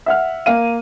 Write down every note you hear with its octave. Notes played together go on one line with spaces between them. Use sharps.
E5 F#5 F6
A#3 F5 D#7